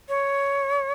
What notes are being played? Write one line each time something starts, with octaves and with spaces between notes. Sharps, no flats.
C#5